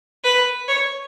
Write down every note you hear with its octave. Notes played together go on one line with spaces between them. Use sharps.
B4
C#5